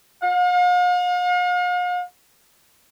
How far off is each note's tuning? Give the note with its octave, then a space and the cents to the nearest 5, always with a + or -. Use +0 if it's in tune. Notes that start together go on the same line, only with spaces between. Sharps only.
F5 +45